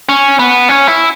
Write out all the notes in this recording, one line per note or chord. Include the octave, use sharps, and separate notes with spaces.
C#4
B3
C#4
E4